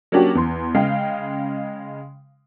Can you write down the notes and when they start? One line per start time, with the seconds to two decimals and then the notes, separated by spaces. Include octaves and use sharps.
0.12 F#3 A#3 C#4 D4 F#4 G4
0.35 E2 C6
0.74 C#3 G#3 F5 G5